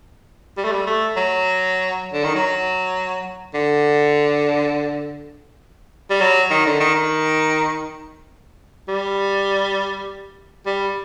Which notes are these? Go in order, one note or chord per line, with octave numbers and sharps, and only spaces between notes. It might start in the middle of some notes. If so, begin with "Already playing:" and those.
G3
A3
G3
A3
F#3
D3
D#3
F#3
D3
G3
F#3
D#3
D3
D#3
D#3
G3
G3